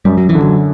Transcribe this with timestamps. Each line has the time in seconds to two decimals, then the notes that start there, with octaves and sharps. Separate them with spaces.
0.05 F#2 G3
0.18 F#3
0.29 E3
0.35 D3
0.42 F#3